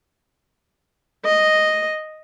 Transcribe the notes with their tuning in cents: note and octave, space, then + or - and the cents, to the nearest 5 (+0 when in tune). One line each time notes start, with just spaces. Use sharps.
D#5 -5